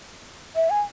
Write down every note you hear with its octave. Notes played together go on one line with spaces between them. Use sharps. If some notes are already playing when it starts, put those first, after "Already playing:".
E5
G#5